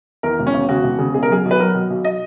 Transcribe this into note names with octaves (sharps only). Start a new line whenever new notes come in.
E2 A#4
E1
C#4
E1
C#3 F#4
E1
C#3
B2 G#4
A#4
F#3 G#4
B1
B4
F#3 A#4
B2
B1
D#5